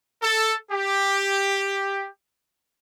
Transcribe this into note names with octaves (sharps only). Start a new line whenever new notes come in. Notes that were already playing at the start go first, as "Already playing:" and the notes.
A4
G4